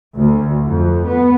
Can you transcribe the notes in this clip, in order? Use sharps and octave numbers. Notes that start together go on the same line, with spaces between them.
D2
F2
B3